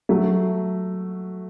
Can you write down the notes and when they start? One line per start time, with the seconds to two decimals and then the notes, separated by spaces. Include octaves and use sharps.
0.09 F#3 A3